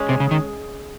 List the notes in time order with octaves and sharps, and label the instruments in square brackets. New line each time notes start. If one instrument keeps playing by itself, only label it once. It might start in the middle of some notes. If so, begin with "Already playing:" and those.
Already playing: [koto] G#3 C#4 G#4
[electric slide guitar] C3
C#3
D#3